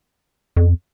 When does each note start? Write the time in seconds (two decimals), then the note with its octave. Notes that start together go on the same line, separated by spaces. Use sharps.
0.56 F2